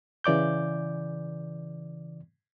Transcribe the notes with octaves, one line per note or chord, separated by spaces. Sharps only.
C#3 E3 D5 D6 G6